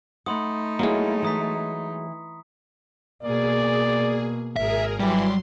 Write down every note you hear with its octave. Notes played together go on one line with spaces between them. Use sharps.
A3 D#4 F#5 B5 C6 D#6
F#3 G#3 A#3 E4 C#7
E3 A#5 D#6 B6
B2 A#3 G#4 D5
G#1 G#4 A#4 E5
E3 F#3 G3 C6